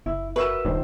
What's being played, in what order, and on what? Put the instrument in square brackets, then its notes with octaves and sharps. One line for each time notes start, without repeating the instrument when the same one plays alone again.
[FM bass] F#1 [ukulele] E4
[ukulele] F#4 A#4 [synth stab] B4 [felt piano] E5 E6 E7
[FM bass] D#1 [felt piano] A#1 D#3 C5 [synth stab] G2